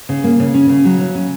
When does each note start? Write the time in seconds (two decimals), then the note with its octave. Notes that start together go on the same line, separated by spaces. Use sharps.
0.09 C#3
0.24 A#3
0.40 C#3
0.54 C#4
0.69 C#3
0.85 F#3
1.01 C#3
1.15 C#4